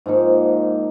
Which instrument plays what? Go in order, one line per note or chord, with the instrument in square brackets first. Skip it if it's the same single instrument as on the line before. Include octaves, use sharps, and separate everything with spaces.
[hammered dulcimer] G#2 F3 A#3 D#4